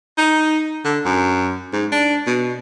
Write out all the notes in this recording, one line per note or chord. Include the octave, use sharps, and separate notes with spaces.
D#4
D3
F#2
G#2
D4
B2